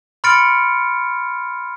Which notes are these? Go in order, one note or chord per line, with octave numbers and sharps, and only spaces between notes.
B5 C6 F6 A6 C#7 D7